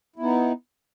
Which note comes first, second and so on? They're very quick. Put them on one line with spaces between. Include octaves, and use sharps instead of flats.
E4 B3 D#4